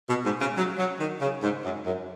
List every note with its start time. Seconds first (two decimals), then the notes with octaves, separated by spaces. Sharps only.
0.08 B2
0.24 G#2
0.41 C#3
0.56 F#3
0.78 F#3
0.99 D#3
1.21 C#3
1.43 G#2
1.64 F#2
1.85 F#2